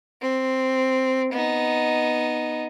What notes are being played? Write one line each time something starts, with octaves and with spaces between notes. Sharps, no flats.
C4
B3 D#4